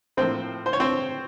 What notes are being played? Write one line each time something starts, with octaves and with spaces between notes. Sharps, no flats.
A2 F3 A#3 C4 C5
C5
C#5
C4 C5